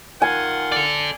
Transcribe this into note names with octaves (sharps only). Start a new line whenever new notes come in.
D#3 F4 F#5 G#5
A4 D5